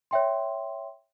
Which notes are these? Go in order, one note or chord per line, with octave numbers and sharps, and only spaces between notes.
C#5 E5 G5 C6